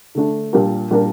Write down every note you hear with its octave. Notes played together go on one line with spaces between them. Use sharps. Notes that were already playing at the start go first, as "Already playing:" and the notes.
D3 A3 D4
A#2 G3 D4 G4 A#4
A#2 G3 D4 G4 A#4